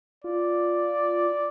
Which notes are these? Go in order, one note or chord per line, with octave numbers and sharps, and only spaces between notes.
F4 D5